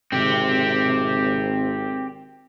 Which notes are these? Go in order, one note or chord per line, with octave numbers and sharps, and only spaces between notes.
G#1 C4 G4